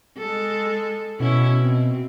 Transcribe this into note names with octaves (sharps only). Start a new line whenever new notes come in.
G#3 A4
B2 C#4 E4
C4